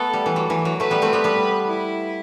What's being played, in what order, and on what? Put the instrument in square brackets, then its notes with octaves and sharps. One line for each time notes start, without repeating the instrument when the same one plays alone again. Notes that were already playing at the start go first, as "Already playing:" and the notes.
Already playing: [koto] A3 B3 [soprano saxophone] A4
[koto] G3
E3
F#3
E3
F#3
[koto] F#3 A3 [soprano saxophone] B4
[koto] G3 B3
A3 C4
G3 B3
G3 B3
[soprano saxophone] E4